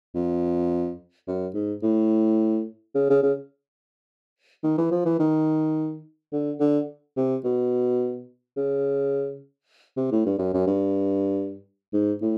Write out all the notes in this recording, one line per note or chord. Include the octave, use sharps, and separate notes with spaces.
F2
F#2
G#2
A2
C#3
C#3
C#3
D#3
E3
F3
E3
D#3
D3
D3
C3
B2
C#3
C3
A2
G2
F#2
F#2
G2
G#2
A2